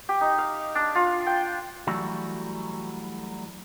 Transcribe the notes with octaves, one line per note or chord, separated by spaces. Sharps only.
G4
D#4
F5
D4
F4
G5
E3 F#3 G3 A3 E4 F#4